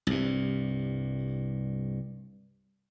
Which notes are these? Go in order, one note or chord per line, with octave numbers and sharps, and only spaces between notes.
C2 G2